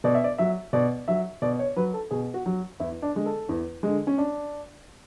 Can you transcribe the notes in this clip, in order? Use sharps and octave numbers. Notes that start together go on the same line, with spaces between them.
B2 D5
E5
D5
F#3 E5
B2 D5
F#3 E5
B2 D5
C#5
F#3 B4
A4
B2 G#4
F#4
F#3
E2 E4
D4
D3 G#3
A4
E2
D3 G#3
C#4
D4